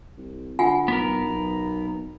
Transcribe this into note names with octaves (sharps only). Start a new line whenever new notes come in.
C2
D3 F4 F#5 G#5
B1 B3 A#4
B1